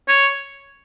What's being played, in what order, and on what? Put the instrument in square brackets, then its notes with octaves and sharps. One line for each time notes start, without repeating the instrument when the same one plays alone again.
[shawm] C#5